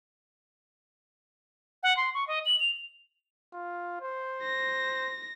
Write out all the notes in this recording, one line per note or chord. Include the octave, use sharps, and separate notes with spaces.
F#5
C6
C#6
D#5
F#7
F7
F4
C5
A#6